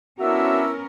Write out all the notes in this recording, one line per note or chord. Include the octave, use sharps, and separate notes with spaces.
B3 C#4 D4 E4 F#4 A#4 E5 E6